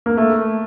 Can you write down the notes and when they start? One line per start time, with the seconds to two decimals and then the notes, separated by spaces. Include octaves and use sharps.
0.06 A#3
0.17 A3